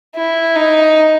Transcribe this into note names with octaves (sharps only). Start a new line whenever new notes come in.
E4
D#4